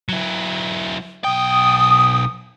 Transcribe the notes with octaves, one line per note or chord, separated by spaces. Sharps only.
F#3 E4
B1 G5 D#6